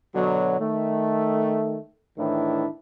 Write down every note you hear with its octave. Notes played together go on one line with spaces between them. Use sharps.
B2 D3 F#3
D#3 A3
A2 D#3 E3 D4 E4